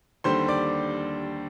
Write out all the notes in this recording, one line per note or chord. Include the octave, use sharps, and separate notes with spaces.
D#2 D3 G3 C5 C6
D5 D6